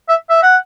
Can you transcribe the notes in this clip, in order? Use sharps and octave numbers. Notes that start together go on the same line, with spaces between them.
E5
E5
F#5